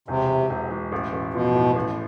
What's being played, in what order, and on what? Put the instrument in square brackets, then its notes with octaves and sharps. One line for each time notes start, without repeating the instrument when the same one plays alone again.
[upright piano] E1 [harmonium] C3
[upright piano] E1
E1
E1
A1
A1
[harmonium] B2 [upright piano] F3
[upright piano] A2
A1